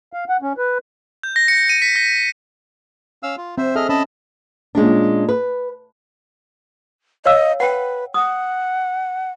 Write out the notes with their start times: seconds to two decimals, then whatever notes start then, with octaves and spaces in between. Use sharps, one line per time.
0.13 F5
0.29 F#5
0.42 C#4
0.58 B4
1.23 G6
1.36 A#6
1.48 C#7
1.69 D#7
1.82 B6
1.96 A#6
3.23 C#4 F5 E6
3.37 F4
3.58 C4 C5 E5
3.76 G#4 A4 D#5 E5 F6
3.89 C#4 D#5 A5 B5
4.75 A#2 G#3 C#4 D4
5.29 B4
7.26 C#5 D#5 F5 E6
7.60 B4 F#5 G5
8.14 F#5 D#6